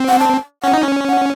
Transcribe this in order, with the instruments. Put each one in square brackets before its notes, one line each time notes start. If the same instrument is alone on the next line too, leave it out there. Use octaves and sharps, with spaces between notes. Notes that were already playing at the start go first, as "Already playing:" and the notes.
Already playing: [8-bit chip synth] C4
[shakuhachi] F#5
A5
[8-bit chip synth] C#4 [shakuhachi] F#5
[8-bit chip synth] D#4
C#4
[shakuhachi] F#5